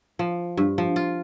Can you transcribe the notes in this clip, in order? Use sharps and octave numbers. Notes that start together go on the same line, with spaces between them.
F3
G2
F3
F4